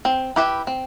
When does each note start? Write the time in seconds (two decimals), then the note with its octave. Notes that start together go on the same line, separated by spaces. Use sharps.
0.05 C4
0.36 E4 G4 B4 E5
0.67 C4